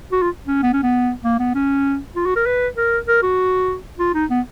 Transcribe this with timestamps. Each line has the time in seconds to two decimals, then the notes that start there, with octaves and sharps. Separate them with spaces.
0.12 F#4
0.22 F4
0.47 C#4
0.63 B3
0.73 C#4
0.83 B3
1.24 A#3
1.39 B3
1.55 C#4
2.16 F4
2.26 F#4
2.36 A#4
2.46 B4
2.77 A#4
3.08 A#4
3.23 F#4
3.99 F4
4.14 D#4
4.30 B3